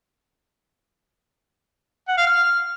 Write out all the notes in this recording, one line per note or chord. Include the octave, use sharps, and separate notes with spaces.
F#5
F5
F6